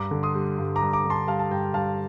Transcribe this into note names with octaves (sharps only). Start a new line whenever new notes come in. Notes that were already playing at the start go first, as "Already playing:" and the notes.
Already playing: G2 A#5 D6
D3
C6 D#6
G3
G2
A#5 D6
G2
A#5 D6
D3
A5 C6
G3 F5 A5
A5
G2 G5 A#5
G2 F5 A5